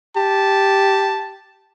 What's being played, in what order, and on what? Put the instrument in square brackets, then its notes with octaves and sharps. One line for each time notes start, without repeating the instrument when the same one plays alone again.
[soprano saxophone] G4 [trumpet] A5